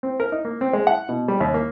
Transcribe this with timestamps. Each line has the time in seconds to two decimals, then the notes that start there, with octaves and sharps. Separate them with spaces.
0.03 C4
0.20 A#4
0.32 D#4
0.45 A#3
0.61 C4
0.73 G#3
0.87 F#5
1.09 B2
1.28 G3
1.40 D#2
1.54 A#3